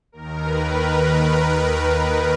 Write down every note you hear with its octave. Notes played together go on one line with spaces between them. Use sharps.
D#2 D#3 A#4
B4
A#4
A#4